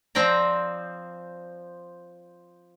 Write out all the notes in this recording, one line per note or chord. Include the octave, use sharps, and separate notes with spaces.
F3 C4 D5 G5 A#5